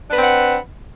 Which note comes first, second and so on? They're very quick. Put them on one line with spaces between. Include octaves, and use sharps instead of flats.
D4 B4 C4 F#5